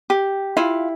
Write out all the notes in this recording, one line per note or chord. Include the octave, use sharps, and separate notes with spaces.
G4
E4 F4 F5